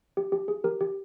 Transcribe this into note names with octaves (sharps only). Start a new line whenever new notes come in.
G4
G4
G#4
G4 A#4
G4